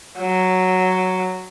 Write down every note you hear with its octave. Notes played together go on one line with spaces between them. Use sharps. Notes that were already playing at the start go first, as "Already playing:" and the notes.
F#3